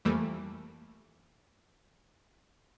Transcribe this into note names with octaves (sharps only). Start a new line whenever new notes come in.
F2 E3 G3 A3 A#3